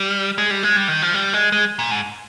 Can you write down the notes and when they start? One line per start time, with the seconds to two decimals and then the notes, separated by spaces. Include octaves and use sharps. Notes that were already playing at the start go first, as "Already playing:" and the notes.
Already playing: G3
0.38 G#3
0.51 G3
0.63 G#3
0.77 G3
0.88 D#3
1.02 F3
1.14 G3
1.33 G#3
1.52 G#3
1.79 A#2
1.91 G#2